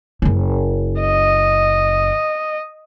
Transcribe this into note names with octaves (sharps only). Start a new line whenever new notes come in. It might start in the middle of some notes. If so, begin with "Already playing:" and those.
F#1 C#3
D#5